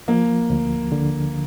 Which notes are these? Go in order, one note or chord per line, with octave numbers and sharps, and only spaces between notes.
F3 A#3
D2
D3